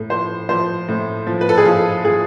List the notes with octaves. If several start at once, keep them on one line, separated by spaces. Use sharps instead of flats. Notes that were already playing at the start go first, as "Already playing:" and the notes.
Already playing: A2
F3 C5
F3 C5
A2
F3
B4
A4
G#4
F3 F4
F3 G#4